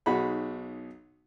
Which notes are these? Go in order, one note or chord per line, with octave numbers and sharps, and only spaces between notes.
B1 D#4 F#4 G#4 B5